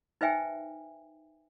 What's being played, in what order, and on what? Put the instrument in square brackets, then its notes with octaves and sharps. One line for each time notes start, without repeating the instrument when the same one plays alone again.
[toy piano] D#4 B4 C5 E5 G5 G#5